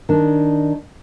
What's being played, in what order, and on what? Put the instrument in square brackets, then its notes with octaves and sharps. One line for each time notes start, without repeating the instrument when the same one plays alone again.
[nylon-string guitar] D#3 D4